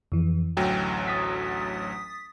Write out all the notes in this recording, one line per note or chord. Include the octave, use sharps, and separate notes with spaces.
F2 E3
A1 D2 F#3 G5
D#6 A6 B6